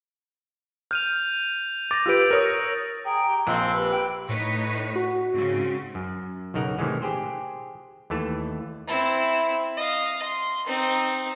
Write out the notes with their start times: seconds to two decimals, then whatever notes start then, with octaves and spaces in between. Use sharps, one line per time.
0.91 F6 G6 D#7 F7
1.91 D6 A6 A#6
2.06 F4 G4 B4 E6 D7
2.31 A#4 C#5 D#6
3.05 G#4 G5 A#5
3.27 G4
3.47 A#1 C4 E6
3.74 G4 B4
3.91 G5
4.29 A2 D#4 B4 C#5
4.96 F#4
5.34 G#2 C#3 C4 C#4
5.95 F#2
6.54 B1 C#3 D#4 A#4 F#5
6.79 A2 C3 D#3 E3 G#3
7.02 G4 G#4 C5
8.10 D#2 E3 A3 A5
8.87 C4 E4
9.77 D#5 F5
10.24 C6
10.66 C4 D#4